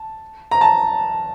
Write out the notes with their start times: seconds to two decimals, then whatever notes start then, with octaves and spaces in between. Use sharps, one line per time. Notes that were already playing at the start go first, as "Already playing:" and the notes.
Already playing: A5
0.51 A#5
0.61 A5